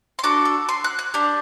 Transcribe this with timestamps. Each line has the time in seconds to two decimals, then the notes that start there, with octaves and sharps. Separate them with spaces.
0.19 C6
0.23 D4 F#4 A4 D6
0.45 E6
0.69 C6
0.84 F#6
0.99 F#6
1.14 D4 G4